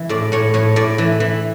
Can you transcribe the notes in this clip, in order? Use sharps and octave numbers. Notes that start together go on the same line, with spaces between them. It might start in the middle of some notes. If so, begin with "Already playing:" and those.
Already playing: E3
A2 D5
A2 C#5
A2 C#5
A2 D5
E3
E3